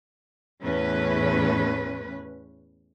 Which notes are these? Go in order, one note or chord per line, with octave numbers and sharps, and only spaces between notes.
E2 A2 C#4 B4